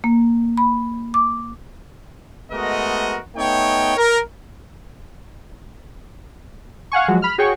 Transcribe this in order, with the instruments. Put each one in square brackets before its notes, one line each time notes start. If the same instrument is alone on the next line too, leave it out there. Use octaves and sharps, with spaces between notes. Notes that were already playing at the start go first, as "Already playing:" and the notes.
[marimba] A#3
B5
D6
[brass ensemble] G#3 A3 B3 F#4 A#4 D#5
A3 B3 D#4 C#5 G5
A#4
[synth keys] F5 F#5 G#5 C#6
F3 F#3 G#3 F#4
B5 F6
F#4 G#4 C#5 G5 C#6